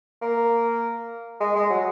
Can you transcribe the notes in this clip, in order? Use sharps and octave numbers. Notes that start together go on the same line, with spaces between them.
A#3
G#3
G#3
F#3